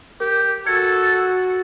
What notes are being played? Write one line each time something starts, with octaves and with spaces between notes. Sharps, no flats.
G4 A#4
F#4 A4 G#6 C#7